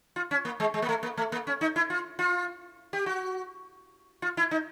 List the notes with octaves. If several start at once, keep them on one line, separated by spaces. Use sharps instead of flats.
F4
C#4
A#3
G#3
G#3
A#3
A3
A#3
A3
A#3
C#4
D#4
E4
F4
F4
G4
F#4
F4
E4
D#4